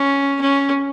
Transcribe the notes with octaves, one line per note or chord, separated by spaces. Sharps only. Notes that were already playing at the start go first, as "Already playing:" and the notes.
Already playing: C#4
C#4